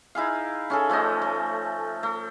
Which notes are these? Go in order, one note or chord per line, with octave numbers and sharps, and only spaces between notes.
D#4 E4 G#4 F5
C#4 G#4 A4
F3 A3 C#4 D#5
A3
A3